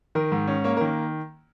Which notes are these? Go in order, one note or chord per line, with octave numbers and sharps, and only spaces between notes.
D#3 A#4
G#2
C#4
A#3 C#5
A#4
D#3